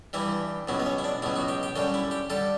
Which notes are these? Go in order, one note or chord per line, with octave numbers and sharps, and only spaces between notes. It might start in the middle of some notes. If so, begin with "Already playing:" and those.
G2 E3 G3 E4
C#2 B2 F#3 E4
B3
C#4
E4
D4
C#2 B2 F#3 E4
F#4
G4
G4
F#2 D3 G3 G4
E4
G4
D3 G3 A4